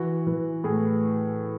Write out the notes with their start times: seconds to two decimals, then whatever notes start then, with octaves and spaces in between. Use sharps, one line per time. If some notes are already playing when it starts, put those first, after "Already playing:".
Already playing: E3 F#4
0.27 E3
0.64 A2 G#4